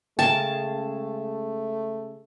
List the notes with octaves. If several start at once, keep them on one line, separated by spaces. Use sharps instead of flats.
C#3 G#3 A3 A#4 G5 A5